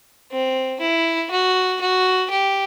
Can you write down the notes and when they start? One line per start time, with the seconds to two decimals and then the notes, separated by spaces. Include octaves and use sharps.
0.31 C4
0.81 E4
1.31 F#4
1.80 F#4
2.30 G4